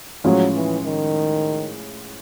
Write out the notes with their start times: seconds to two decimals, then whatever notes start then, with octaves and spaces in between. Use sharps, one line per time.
0.24 A2 F3 F#3 G#3 C#4 F4
0.55 E3
0.86 D#3